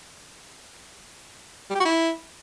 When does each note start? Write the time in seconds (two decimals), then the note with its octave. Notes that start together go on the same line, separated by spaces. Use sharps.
1.70 G3
1.75 G4
1.80 F#4
1.85 E4